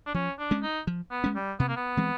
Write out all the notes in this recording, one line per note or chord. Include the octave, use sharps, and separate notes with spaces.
D4
F3 C#4
D4
G#3 C#4
D#4
F3
B3
G#3 C#4
G3
C3 B3
A#3
B3
E3 G#3 C4